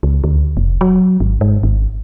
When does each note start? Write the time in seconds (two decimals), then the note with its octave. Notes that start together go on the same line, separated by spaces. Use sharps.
0.03 C#2
0.24 D2
0.57 F1
0.81 F#3
1.20 G#1
1.41 G#2
1.63 G#1